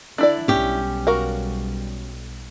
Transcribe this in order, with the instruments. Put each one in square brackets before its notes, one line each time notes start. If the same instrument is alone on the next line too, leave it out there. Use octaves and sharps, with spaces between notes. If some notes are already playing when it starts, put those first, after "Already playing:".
[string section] D3 [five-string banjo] D4 E4 D5
[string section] B1 G3 [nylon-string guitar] C#4 G4
[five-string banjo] F#4 A#4 F5